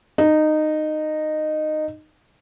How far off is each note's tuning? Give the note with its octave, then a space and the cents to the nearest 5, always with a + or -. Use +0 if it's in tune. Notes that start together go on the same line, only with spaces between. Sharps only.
D#4 -15